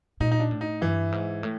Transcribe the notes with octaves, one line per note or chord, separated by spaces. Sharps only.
A#2 D#4
D#4
D4
A2
D#4
G2 E3 E4
G#2
A2